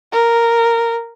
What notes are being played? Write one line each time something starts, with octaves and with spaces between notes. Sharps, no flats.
A#4